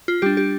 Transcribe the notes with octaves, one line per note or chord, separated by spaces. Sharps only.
F4
G3 D4 G4
G4